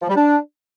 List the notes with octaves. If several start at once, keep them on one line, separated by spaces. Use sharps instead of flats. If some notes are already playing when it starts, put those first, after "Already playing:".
F3
G3
D4